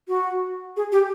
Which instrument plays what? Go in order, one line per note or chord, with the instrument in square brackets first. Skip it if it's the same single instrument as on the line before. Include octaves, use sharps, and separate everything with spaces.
[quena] F#4
G#4
G4